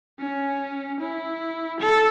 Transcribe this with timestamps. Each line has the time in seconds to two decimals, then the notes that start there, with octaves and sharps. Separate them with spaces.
0.19 C#4
1.00 E4
1.80 A4